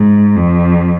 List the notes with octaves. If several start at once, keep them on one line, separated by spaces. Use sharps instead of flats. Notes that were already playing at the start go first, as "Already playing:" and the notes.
Already playing: G#2
F2